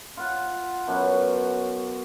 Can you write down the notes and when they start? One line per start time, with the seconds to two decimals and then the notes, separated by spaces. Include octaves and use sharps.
0.17 F4 F#5
0.87 F#2 B2 F#3 F#5